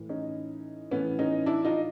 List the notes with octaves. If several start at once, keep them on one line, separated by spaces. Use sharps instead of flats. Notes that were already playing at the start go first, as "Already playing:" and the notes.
Already playing: A2 E3
C#4 D#4
A2 E3 B3 C#4
C#4 D#4
D4 E4
D#4 F4